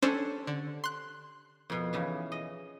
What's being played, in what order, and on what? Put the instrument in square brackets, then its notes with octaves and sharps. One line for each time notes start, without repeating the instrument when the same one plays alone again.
[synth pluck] C#4 D4 C5 [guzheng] G4 A4 C#5
[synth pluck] D3
C6 F#6
[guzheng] F2 B2
E2 C#3 E3
D#5